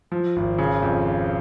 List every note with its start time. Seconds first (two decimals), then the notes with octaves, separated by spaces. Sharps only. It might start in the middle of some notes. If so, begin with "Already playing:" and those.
0.12 F3
0.36 G#1
0.59 C#3
0.83 F2